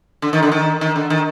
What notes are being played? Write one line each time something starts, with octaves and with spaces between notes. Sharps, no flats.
D3
D#3
D3
D#3
D#3
D3
D#3